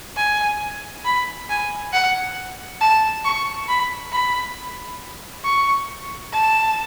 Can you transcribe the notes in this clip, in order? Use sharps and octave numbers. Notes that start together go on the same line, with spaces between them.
G#5
B5
G#5
F#5
A5
C#6
B5
B5
C#6
A5